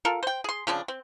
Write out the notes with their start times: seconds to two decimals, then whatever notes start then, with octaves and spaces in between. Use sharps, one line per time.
0.05 F4 A4 A#4
0.23 C5 G5
0.44 G#4 C6
0.67 C#3 F3 C4 D4
0.88 C4